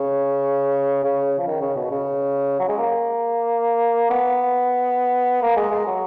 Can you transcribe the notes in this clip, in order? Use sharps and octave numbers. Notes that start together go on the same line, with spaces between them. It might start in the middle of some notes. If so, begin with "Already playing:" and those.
Already playing: C#3
C#3
F3
D#3
C#3
B2
C#3
F#3
G#3
A#3
B3
A#3
G#3
G#3
F#3